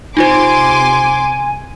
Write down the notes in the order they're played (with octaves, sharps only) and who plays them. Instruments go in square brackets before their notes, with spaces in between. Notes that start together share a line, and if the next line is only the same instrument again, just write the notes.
[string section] C3 C6 D6 [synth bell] D#4 F4 C5 [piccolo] G#5